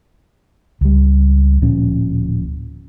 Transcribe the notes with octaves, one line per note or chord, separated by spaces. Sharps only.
C#2 G3
D1 A#2 F3 C#4